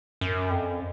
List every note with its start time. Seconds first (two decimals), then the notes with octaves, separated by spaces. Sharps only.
0.21 F#2
0.50 F2